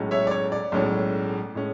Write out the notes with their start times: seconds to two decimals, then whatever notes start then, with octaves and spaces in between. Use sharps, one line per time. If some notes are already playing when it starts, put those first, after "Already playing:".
Already playing: B1 A2 G#3 C#4
0.11 C#5 E5
0.27 D5
0.31 C#5
0.52 D5
0.72 B1 A2 G#3 C#4
1.55 A2 G#3 C#4